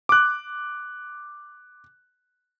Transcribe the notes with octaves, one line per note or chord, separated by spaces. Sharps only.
D6 F#6